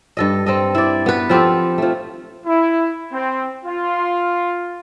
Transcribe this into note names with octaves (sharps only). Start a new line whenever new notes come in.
G2 A4 D#5
C4 A4 D#5
E4 D5
B3 B4
F3 C4 G4 A4
F3 A3
E4
C4
F4